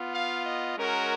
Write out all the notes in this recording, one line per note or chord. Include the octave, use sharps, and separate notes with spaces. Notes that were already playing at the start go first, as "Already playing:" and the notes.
Already playing: B3 F4
F5
D#5
G#3 C#4 F#4 A#4